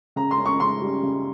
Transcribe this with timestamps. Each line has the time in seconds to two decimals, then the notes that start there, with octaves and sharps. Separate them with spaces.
0.16 C#3 A#5
0.31 C6
0.38 C#4
0.46 C#6
0.60 C#3 C6
0.81 G3
1.03 C#3